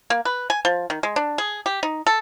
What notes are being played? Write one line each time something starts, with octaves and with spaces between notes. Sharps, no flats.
A#3
B4
G#5
F3
D#3
G#3
D4
G#4
G4
D#4
A4